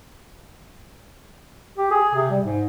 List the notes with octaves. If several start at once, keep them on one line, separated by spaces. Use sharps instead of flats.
G4
G#4
C3
G3
G#2